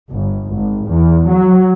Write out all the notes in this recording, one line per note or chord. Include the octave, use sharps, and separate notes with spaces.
G1
G#1
E2
F#3